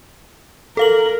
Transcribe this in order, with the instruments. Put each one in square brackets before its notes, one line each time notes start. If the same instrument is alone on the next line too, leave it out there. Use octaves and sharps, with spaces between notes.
[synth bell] A4 F5 F#7 [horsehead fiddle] A#4